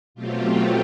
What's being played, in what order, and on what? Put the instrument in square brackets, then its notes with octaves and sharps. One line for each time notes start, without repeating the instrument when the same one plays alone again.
[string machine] B2 F#3 A3 C4 F4 G4